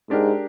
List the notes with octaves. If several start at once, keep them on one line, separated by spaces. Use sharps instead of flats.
G#2 G#3 D4 G4 A#4